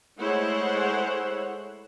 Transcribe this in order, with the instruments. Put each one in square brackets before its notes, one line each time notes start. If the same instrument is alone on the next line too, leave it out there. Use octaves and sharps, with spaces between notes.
[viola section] G#3 A3 E4 C5 C#5 F#5